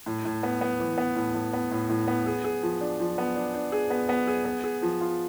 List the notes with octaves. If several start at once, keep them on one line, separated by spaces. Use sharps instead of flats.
A2
A2
B3
B3
E3
B3
A2
A2
B3
A2
A2
B3
G#4
G#4
F3
D4
F3
B3
D4
D4
G#4
B3
B3
G#4
B3
G#4
F3
F4